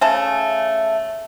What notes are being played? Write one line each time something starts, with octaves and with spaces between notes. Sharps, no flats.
C#3 A3 A5